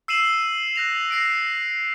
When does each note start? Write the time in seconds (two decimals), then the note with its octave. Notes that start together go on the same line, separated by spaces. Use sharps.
0.08 E6 C7 D#7 E7 F#7
0.76 F#6 A#6 F7
1.11 A#6 C7 D7